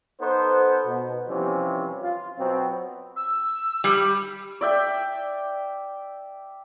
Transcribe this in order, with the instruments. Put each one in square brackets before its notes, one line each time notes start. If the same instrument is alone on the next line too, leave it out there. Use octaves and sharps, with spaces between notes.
[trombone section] B3 D#4 A4 C5
B2
C3 E3 F3 G3 C#4
F4
B2 F#3 C4
[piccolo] E6
[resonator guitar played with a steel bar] G3
[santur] D5 E5 G5